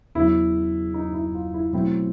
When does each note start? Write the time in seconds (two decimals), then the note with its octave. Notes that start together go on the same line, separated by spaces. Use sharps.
0.15 E2 C#3 F#3 E4
0.94 D#4
1.14 E4
1.34 F4
1.54 E4
1.73 B2 F#3 A3 C4 E4